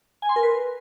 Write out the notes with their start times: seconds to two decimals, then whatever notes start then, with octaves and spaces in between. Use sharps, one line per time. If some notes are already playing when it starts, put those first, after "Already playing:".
0.22 G#5
0.29 C6
0.36 A#4
0.43 B4